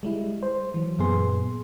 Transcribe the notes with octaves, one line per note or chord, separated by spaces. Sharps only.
G3 G#3 E4
C5
E3 F#3
F#2 A#2 B3 G#4 C6